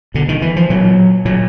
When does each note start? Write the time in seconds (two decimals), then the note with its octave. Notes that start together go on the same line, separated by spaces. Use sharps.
0.14 B2 D3
0.29 D#3
0.42 E3
0.56 F3
0.70 A#2 F#3
1.25 A#2 F#3